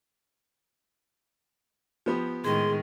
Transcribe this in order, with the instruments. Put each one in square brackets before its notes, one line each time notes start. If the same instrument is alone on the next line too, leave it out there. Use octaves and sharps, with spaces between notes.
[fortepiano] F3 B3 G4
[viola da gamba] A2 D#3 G#3 [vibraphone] G#4 [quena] C6